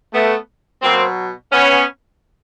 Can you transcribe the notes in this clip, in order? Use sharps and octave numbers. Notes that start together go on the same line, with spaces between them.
A3 B3
B2 F#3 A#3 C4
B3 C#4